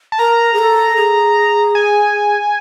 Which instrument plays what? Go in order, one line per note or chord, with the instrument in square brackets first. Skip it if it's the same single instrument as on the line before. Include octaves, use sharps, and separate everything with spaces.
[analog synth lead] A5
[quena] A#4 [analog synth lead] A#5
[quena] G#4
A4
G#4
[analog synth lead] G#5